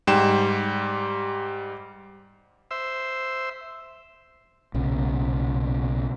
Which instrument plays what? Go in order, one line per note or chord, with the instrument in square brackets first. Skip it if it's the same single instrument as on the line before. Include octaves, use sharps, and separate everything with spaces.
[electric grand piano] G#2 G3 G5 E7
[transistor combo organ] C5 E5
[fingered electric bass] B1 A#2 C#3